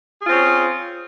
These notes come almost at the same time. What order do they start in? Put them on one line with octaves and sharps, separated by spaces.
G#4 F4 C4 C#4